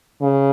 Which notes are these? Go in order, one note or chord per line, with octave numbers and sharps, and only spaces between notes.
C#3